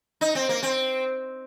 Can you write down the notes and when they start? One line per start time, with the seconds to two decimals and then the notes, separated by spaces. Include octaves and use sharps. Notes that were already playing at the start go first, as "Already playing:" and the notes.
0.21 D#4
0.35 C4
0.49 A#3
0.63 C4